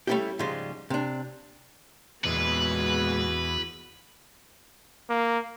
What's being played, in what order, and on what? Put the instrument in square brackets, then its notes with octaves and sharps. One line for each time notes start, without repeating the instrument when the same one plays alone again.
[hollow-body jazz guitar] G3 A3 C4 C#4 E4 G4
G#2 C#3 F3 G3 G#3
C3 D4
[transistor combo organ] E2 [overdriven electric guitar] A#2 G#3 [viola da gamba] B3 F#4 G#4 [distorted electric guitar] B4
[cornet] A#3